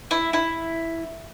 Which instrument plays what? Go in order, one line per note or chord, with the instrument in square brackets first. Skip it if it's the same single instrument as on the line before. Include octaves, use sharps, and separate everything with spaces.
[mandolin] E4
E4